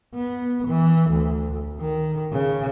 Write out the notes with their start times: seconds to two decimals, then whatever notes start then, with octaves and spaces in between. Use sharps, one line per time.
0.15 B3
0.67 E3
1.11 D2
1.80 D#3
2.32 C#3